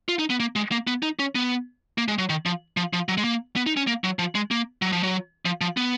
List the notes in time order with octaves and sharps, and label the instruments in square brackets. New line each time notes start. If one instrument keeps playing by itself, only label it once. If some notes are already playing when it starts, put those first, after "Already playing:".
[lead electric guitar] F4
D#4
B3
A#3
G#3
A#3
B3
D#4
C#4
B3
A#3
G#3
F#3
D#3
F3
F3
F3
F#3
G#3
A#3
B3
D#4
C#4
A#3
F#3
F3
G#3
A#3
F#3
F3
F#3
F3
F3
B3